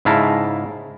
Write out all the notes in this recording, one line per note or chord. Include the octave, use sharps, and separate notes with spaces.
G#2 C#3 E4 F5 A5 A#5